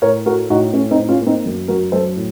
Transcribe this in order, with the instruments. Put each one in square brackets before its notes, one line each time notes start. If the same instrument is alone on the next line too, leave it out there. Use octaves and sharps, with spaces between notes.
[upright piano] A2 A#4 C#5
A3 F#4 A#4
A2 D#4 F#4
A2 C#4
C4 D#4
A2
C#4 F4
A#3
C4 D#4
F#2
F#2 F#4 A#4
F#3 A4 C5
A2